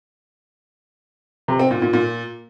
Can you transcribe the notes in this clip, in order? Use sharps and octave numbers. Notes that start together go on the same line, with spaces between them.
C3
C4
A#2
A#2
A#2